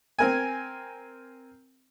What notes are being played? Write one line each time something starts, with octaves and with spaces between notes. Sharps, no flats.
C4 A#4 G#5